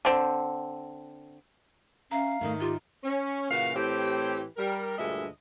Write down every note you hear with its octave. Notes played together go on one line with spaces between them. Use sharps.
D3 C4
C#4 E5 F5 A#5
G#2 D#3 A3 D#4
F4 G4
C#4
A#2 C#3 E3 F#4 F5
A2 E3 C4 G4
G3 A#4
D2 G2 A#2 G#3 D#5 E5